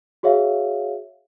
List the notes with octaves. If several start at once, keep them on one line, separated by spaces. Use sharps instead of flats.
F#4 G#4 C#5 E5 F5